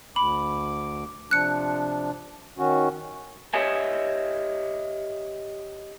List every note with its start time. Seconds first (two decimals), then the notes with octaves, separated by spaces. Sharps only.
0.16 D2 B5 D6
1.31 C3 F3 D4 F#6 C#7
2.58 D#3 C#4 F#4
3.54 G4 C#5 D#5 E5 G#5